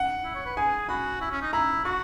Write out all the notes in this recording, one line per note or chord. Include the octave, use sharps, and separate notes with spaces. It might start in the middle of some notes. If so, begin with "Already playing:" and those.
Already playing: F#5
E4
C#5
B4
G#4 G#5
F#4 B5
E4
C#4
D#4
E4 A#5
F#4 C#6